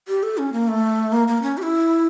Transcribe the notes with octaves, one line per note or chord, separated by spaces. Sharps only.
G4
A4
C#4
A#3
A3
A#3
A#3
C#4
G4
E4